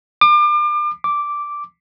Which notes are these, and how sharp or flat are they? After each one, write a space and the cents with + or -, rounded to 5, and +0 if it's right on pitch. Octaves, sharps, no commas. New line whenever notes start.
D6 +35
D6 -5